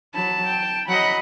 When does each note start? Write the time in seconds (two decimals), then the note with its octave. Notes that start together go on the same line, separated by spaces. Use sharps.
0.14 F#3 A5 B5
0.47 G5
0.89 F#3 D#5 F#5 B5